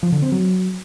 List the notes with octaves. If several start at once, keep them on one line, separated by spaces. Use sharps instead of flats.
F3
D3
C4
F#3